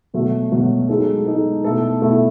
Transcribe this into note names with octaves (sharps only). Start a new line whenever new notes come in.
B2 F#3 A3
B2 F#3 A3
G#3 D#4 A4
G#3 D#4 A4
B2 A3 E4 A4
B2 A3 E4 A4